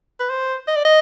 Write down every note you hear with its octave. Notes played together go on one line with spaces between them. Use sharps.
B4
C5
D#5
D5
D#5